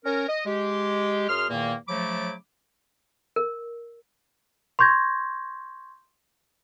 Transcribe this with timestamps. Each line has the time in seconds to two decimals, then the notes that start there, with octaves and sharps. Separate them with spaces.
0.05 C#4 A#4
0.28 D#5
0.46 G#3 G4
1.29 F#2 G#4 C6 F6
1.50 E2 A#2 D#3 A#3
1.89 C#3 F3 F#3 A3 B5 D6
3.36 A#4
4.79 C6 C#6 G6 G#6 A#6